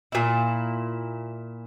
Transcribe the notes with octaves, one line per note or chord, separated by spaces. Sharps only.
A#2 E4